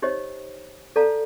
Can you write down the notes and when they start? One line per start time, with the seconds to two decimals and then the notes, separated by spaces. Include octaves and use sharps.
0.02 D#4 G4 C5 C#5 D#5
0.96 A4 D5 F5 A5 A#5